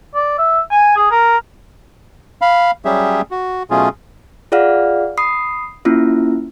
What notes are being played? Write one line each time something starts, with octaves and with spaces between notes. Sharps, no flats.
D5
E5
G#5
G#4
A#4
F5 B5
F#3 G3 C#4 G4 G#4 E5
F#4
B2 F#3 A3 C#4 F4 G#4
F4 G#4 D5 F5 F#5 F6
B5 D#6 C7
A#3 C#4 E4 F4